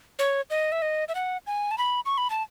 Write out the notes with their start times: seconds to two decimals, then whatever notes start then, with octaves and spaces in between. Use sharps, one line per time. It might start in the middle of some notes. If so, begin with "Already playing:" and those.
0.19 C#5
0.50 D#5
0.72 E5
0.82 D#5
1.08 E5
1.15 F#5
1.47 G#5
1.71 A5
1.78 B5
2.06 C#6
2.18 B5
2.30 A5